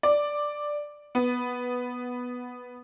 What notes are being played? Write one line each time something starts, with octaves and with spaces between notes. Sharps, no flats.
D5
B3